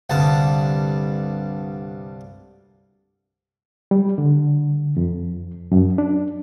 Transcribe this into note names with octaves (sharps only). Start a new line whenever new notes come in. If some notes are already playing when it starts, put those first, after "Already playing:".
C2 G2 D3 A5
G3
D3
F2
F#2
D4